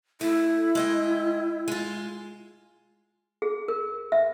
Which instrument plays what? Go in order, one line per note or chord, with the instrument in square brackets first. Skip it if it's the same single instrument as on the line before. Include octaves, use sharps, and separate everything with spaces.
[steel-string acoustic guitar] A3 [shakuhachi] E4
[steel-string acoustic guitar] G#3 D#5 G5
G#3 F4
[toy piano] G#4
A#4
E5